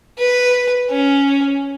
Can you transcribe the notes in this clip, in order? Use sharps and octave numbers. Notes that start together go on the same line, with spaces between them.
B4
C#4